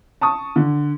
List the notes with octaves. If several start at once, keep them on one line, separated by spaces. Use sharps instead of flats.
A5 C#6 D#6
D3